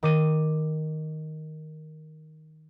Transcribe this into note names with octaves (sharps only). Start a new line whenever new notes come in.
D#3 D6 D#7